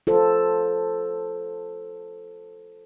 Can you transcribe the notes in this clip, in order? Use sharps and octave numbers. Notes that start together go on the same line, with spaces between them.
F4 A4 C5